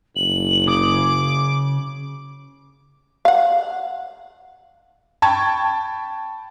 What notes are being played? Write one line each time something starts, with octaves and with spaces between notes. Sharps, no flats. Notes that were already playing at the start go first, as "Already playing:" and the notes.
F#1 F#7
C#3 D6 D#6
F5 F#5
G5 A5 B5 C#6 G#6